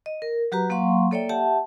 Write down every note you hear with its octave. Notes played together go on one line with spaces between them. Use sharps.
D#5
A#4
F#3 F#4 G4 B4 A#5
F#3 A#3 F5 F#5 C6 C#6
A#3 A4 C#5 D5 E5 G5
G4 E5 F#5 A5